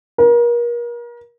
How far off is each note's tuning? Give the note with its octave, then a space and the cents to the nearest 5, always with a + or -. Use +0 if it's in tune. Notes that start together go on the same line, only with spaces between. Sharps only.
A#4 +35